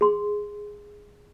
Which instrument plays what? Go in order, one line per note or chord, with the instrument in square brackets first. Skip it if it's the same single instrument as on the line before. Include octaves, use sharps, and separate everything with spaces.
[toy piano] G#4 C6